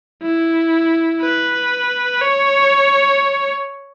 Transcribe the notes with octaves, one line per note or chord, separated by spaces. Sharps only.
E4
B4
C#5